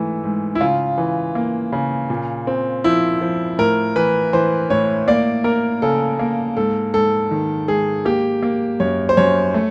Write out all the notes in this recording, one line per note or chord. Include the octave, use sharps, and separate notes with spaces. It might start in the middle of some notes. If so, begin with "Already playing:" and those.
Already playing: G#2 E3 A3
G#2
E4
C#3 F4
E3
A#3
C#3
A#2
C4
F3 E4
F3
A2 A#4
E3 B4
E3 C5
A2 C#5
A#3 D5
A#3 A#4
C#3 A4
A#3
G#2 A4
G#2 A4
D#3
G#2 G#4
A#3 G4
A#3
F#2 C#5
C5
F#2 C#5
A3